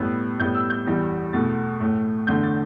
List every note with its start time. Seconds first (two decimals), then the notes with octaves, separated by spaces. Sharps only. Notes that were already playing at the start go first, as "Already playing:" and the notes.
Already playing: A2 G3 B3 E6
0.39 A2 G3 B3 G6
0.55 E6
0.70 G6
0.86 E2 E3 G3
1.33 E2 B2 A3 A6
1.80 A2 A3
2.27 E2 D3 A3 G6
2.43 A6